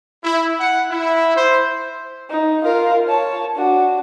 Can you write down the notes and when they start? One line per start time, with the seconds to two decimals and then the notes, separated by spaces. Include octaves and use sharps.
0.24 E4
0.60 F#5
0.90 E4
1.36 C5
2.30 D#4
2.64 F4 A#4
3.07 C#5 A5
3.55 D4 F#4